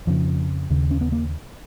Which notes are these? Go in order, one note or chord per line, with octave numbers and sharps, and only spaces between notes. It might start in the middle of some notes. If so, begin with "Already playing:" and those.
F2 C#3 F3
D#2 C#3
C#4
B3
A#3